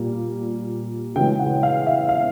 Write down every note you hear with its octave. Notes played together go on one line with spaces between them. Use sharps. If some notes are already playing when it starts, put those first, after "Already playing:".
Already playing: A#2 G3 A#3
C#3 E3 G#3 G5
F#5
F5
E5
F5